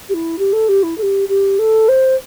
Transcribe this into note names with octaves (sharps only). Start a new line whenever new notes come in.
G4
E4
G4
A4
G4
E4
A4
G4
G4
A4
C5